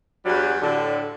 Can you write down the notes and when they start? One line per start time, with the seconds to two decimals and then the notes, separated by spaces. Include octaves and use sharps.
0.25 E2 G2 F#3 G3
0.61 A2 D3